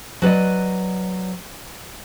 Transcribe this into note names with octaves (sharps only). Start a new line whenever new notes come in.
F#3 B4 D5 D#5